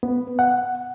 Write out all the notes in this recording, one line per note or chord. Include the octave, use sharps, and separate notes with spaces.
B3
F#5